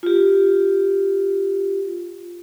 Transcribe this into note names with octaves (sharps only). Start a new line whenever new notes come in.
F4 G4